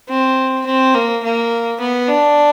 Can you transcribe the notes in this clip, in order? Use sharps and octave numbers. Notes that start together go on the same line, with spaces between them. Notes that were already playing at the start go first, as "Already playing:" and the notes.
C4
C4
A#3
A#3
B3
D4